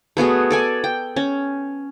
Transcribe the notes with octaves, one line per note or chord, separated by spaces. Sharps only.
A3 B3 F#4 G#4
A4 D5 G#5
G5
C#4